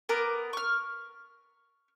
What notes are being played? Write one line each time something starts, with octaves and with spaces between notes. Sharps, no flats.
B3 A#4 D6
C#6 F6